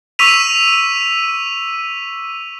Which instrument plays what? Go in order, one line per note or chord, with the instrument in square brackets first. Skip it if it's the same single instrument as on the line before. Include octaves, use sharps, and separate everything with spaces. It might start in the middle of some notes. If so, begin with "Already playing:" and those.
[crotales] C#6 D6 E6 B6 D#7 F7